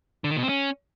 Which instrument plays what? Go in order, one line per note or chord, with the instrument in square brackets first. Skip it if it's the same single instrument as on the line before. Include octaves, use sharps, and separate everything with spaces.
[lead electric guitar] D3
D#3
B2
C4
C#4